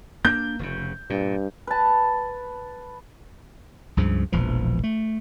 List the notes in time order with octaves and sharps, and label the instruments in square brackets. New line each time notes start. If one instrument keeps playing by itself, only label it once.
[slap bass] A#3 D4 [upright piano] G6
[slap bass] F1 G#2 C#3
[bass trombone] G2 [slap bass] A#2
[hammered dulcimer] B4 A5
[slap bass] C#2 G2 C#3 F3
E1 A#1 E3 F3
A3